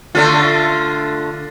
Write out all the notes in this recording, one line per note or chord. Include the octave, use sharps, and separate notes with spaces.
D3 A3 F4